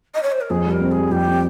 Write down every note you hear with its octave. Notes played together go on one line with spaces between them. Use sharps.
D#5
C#5
C5
A#4
F2 G#4
G3 A#4
C4
G#4
G3
F2 G4
C4